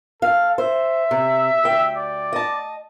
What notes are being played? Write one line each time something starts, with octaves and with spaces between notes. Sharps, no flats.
A4 F5
C5 E5
C3
D2 G5
D5
D#5 A5